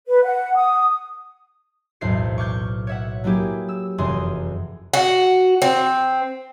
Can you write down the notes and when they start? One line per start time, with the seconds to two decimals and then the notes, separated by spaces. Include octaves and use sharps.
0.07 B4
0.24 F#5
0.55 D#6
2.01 B1 E2 A2 C5 C7
2.38 C#6 D6 F6 G6
2.87 C#5 E5 F#5
3.24 F#3 A#3 E4 G4 G#4
3.68 E6
3.98 F1 F#2 E3 G#4 C6 D#6
4.94 F#4
5.62 C4